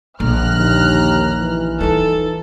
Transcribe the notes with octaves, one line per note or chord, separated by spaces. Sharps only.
A#1 D3 A#5 F6 F#6
D#2
E3
D#4 F4 A4